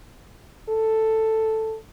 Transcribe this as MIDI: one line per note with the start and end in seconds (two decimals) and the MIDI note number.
0.69 1.76 69